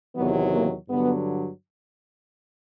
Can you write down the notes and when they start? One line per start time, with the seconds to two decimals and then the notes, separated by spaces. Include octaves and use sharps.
0.16 E2 C3 D#3 F#3 B3
0.53 A#3
0.90 G2 D3 F#3 B3